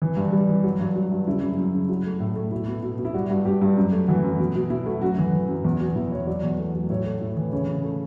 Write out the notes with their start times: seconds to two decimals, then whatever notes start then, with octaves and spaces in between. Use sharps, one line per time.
0.02 E3
0.17 G2
0.32 G3
0.49 E3
0.64 F#3
0.80 G2
0.96 F#3
1.11 G2
1.27 C#3 E4
1.42 F#2
1.58 F#2
1.74 C#3
1.89 F#3 E4
2.05 A3
2.20 A2
2.36 A3
2.51 B2 E4
2.68 B2
2.83 B2
2.99 B2
3.05 E4
3.14 G3 F#4
3.30 G2 F#4
3.45 G2 G4
3.61 G2
3.77 F#2
3.92 A3
4.08 E3 F#4
4.24 F#2
4.40 B2
4.55 B2
4.70 B2 E4
4.86 A3 F#4
5.01 F#2 F#4
5.18 E3
5.33 E3
5.48 F#2
5.65 E2
5.80 B2
5.96 E2 E4
6.12 B2 C#5
6.27 F#3 D5
6.43 E2
6.58 A3
6.75 F#3
6.89 A2 C#5
7.05 A3
7.21 A2
7.36 E3
7.52 C#3 C#5
7.68 C#3
7.84 A3